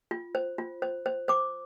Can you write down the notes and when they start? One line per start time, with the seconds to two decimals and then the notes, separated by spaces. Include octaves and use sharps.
0.11 F4
0.35 C5
0.58 F4
0.82 C5
1.06 C5
1.28 C5 D6